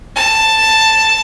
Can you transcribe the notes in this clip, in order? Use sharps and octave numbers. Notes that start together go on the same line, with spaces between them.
A5